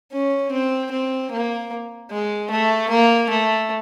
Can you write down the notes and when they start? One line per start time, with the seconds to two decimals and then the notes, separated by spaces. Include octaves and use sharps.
0.12 C#4
0.51 C4
0.91 C4
1.31 A#3
2.11 G#3
2.50 A3
2.90 A#3
3.30 A3